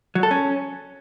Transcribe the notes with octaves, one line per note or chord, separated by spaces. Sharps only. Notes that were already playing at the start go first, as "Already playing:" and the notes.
F#3
A4
C#4